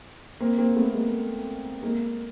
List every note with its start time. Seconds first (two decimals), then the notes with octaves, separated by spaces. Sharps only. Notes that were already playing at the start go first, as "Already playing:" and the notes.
0.40 A#3 C4
0.58 A#3 C4
0.76 A3 B3
0.93 G#3 A#3
1.83 G#3 A#3